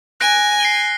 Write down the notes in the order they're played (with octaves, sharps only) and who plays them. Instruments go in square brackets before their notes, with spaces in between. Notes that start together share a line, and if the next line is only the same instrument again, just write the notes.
[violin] G#5 [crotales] F#6 A#6 D7
[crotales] C7 D7 G7